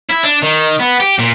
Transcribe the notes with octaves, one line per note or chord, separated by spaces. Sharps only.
E4
D4
D#3
B3
G4
A#2